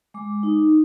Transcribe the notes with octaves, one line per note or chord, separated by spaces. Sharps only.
G#3 D6
D#4